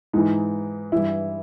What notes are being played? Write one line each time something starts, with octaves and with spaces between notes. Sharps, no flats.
G#2 E3 D#4
G2 E3 E4